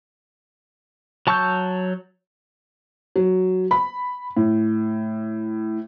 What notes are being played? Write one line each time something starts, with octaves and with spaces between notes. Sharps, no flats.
F#3 A5 C#6 E6 G6
F#3
B5
A2